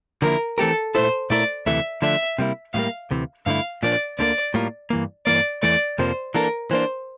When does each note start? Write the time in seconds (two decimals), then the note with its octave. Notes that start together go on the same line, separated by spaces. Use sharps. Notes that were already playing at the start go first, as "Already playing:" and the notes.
0.22 D3 F3 A#3 E4 A#4
0.58 E3 A3 C4 G4 A4 A#4
0.95 A#2 A3 E4 A4 C5
1.30 A#2 A3 E4 A#4 D5
1.66 D2 C3 E3 A3 E5
2.02 D3 F3 A3 D4 E5
2.39 C3 G3 A#3 E4
2.74 A2 E3 G3 A#3 F5
3.11 D2 C3 E3
3.46 G2 D3 A3 E4 F5
3.83 A#2 F3 A#3 D4 D5
4.19 D2 D3 G3 A#3 D5
4.54 A2 G3 A#3 F4 A#4
4.90 G2 E3 A#3
5.26 G2 E3 A#3 D5
5.62 E2 E3 A3 D5
5.99 F2 C3 F3 A#3 C5
6.34 E3 A#3 D4 A4 A#4
6.71 E3 A#3 D4 C5